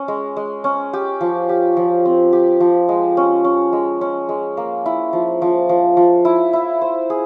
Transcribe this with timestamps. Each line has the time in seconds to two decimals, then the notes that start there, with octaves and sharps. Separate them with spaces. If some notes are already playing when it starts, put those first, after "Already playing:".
Already playing: C#4
0.08 G#3
0.37 G#3
0.64 C#4
0.93 G4
1.21 F3
1.49 G4
1.77 F3
2.05 C4
2.33 G4
2.60 F3
2.89 G#3
3.17 C#4
3.45 C#4
3.73 G#3
4.01 C#4
4.29 G#3
4.57 A#3
4.86 E4
5.13 F3
5.42 F3
5.69 F3
5.97 F3
6.25 E4
6.53 E4
6.82 C5
7.10 G#4